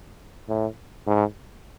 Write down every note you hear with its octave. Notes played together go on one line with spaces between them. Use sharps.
A2
G#2